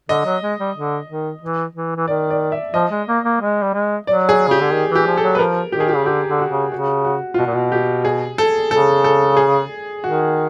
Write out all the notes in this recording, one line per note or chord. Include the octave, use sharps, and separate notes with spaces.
D3 D#5
F#3
G#3
G3
D3
D#3
E3
E3
E3
D#3 D5
D5
E5
F3 D#5
G#3
A#3
A#3
G#3
G3
G#3
F#3 D5
G#4
C#3 G4
D3
D#3
E3
G4
F3
A4
F#3
B4
F3 A#4
D#3 G4
G#4
G4
C#3
D3 G4
D3
F#4
C#3
C#3 F#4
F#4
F4
B2 F#4
A#2
B2
G4
G#4
A4
C#3 A4
A4
G#4
D#3 F#4